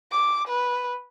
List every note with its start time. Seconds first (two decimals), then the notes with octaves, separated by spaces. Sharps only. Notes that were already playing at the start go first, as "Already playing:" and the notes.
0.12 D6
0.48 B4